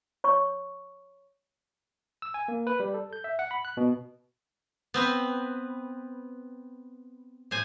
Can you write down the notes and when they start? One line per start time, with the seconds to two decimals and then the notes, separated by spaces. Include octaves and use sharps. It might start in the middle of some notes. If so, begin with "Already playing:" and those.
0.24 C#5 C#6
2.22 E6
2.34 G#5
2.48 A#3
2.67 B4
2.80 G3
2.94 A4
3.13 G6
3.24 E5
3.39 F#5
3.51 B5
3.65 F#6
3.77 B2
4.94 B3 C4 B4
7.51 A2 C5 G#5